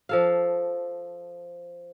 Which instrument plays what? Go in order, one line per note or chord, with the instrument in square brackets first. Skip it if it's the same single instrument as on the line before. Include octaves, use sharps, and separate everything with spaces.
[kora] F3 A4 F5